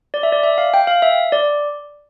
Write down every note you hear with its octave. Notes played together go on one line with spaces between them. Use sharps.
D5
E5
D5
E5
F5
G5
F5
E5
D5